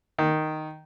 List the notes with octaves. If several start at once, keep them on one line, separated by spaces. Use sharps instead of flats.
D#3